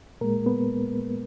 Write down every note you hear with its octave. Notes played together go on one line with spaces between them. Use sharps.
A#2 G#3 A#3 A#4
B3 B4